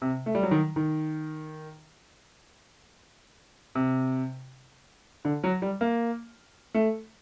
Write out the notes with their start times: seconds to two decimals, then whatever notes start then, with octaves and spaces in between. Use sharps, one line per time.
0.02 C3
0.26 A3
0.35 G3
0.43 F#3
0.51 D#3
0.76 D#3
3.75 C3
5.25 D3
5.44 F#3
5.62 G3
5.81 A#3
6.74 A3